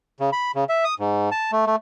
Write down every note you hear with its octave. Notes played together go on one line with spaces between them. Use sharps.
C#3
B5
C#3
E5
D#6
G#2
A5
A3
A3